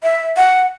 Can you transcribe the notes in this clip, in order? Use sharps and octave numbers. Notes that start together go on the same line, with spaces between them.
E5
F#5